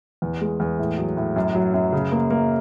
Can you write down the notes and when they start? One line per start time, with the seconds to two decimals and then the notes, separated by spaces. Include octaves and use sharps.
0.22 E2
0.41 G#3
0.60 E2
0.79 A2
0.98 F#3
1.17 A2
1.36 F#2
1.55 F#3
1.74 F#2
1.93 C#3
2.12 A#3
2.31 A#3